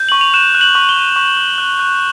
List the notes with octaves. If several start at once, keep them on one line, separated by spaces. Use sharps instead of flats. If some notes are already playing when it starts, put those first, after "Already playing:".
Already playing: G6
C#6 F#7
F7
F#6 E7
F#6
F#7
C#6
G7
F#6
C#6
F#6
F#6
F#6